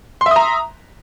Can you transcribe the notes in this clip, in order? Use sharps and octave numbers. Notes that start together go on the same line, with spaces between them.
E5 A#5 C6 D#6